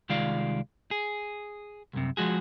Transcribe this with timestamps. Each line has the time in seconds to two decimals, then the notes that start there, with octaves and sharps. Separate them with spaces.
0.09 C2 D#3 G#3 F4 D5 F5
0.91 G#4
1.93 C2 F#2 C3
2.17 F3 G#3 F#4 G#4